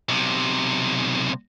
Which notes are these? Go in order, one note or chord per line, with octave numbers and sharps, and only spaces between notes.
B1 C3